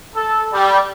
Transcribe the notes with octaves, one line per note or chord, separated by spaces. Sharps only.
A4
G3